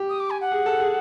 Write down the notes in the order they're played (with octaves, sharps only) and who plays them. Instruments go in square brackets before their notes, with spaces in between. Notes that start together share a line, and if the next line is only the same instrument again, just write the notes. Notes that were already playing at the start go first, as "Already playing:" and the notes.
Already playing: [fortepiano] G4
[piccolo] D#6
D6
G#5
F#5
[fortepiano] G#4
A4
G#4